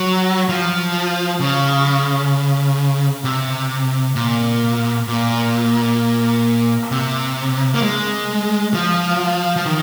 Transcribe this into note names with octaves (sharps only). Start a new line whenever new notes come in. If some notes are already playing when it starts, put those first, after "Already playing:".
Already playing: F#3
F3
C#3
C3
A#2
A#2
C3
A#3
G#3
F3
F3
D#3